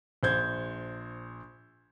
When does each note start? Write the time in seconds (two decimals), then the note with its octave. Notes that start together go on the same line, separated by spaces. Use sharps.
0.23 A#1 C5 G6 G#6